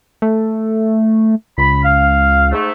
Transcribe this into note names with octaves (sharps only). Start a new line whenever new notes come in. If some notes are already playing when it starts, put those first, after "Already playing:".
A3
C#2 B5
F5
G#2 A3